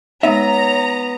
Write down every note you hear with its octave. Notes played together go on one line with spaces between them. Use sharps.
G#3 B3 D#4 C#5 E5 A#5